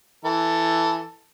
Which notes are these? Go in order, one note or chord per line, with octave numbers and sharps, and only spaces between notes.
E3 A4